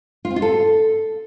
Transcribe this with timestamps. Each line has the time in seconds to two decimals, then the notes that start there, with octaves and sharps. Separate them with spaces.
0.25 F4
0.30 C4
0.36 F4
0.42 A4